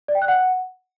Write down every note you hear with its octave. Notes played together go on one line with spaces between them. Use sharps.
D5
G5
F#6
F#5